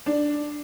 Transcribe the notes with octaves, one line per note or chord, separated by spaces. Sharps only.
D4